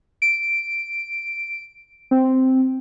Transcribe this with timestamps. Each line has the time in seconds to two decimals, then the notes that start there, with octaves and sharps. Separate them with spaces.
0.22 D7
2.11 C4